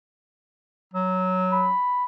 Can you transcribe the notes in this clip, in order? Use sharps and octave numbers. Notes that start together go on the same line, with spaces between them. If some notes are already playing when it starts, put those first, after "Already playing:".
F#3
B5